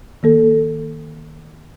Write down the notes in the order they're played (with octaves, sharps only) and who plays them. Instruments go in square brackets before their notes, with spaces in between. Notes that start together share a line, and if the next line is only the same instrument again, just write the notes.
[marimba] D#3 A#3 A4